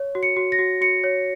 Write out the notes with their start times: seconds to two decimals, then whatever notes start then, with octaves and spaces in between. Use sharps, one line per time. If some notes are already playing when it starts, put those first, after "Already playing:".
Already playing: C#5
0.15 F#4
0.23 C#7
0.37 F#4
0.52 A#6
0.59 F#4
0.81 F#4 C#7
1.04 C#5